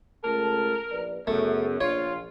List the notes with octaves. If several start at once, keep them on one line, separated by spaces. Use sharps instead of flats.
C#2 A3 A#4 A5
A#1 B4 D5
F#2 C#3 A3 B3 G#4
A#1 F4 C#5